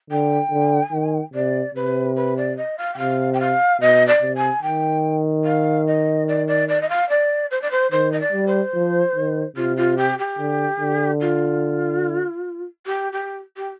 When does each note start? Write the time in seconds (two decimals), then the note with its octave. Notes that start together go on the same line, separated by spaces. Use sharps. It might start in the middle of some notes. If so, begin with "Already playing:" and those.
0.10 D3 G5
0.51 D3
0.92 D#3
1.34 C3 D5
1.75 C3 B4
2.16 B4
2.37 D5
2.57 D#5
2.78 F5
2.94 G5
2.98 C3 F5
3.33 G5
3.40 F5
3.80 B2 D#5
4.07 D5
4.22 C3
4.35 G#5
4.62 D#3 G5
5.44 F5
5.87 D#5
6.28 D5
6.47 D5
6.68 D5
6.81 D#5
6.89 F5
7.09 D5
7.51 C5
7.61 D5
7.70 C5
7.91 D#3 C5
8.12 D#5
8.20 D5
8.33 G3
8.46 C5
8.74 F3
9.15 D#3
9.56 C3 F4
9.77 F4
9.97 G4
10.18 G4
10.39 D3
10.80 D3
11.20 F4
12.86 G4
13.12 G4
13.57 G4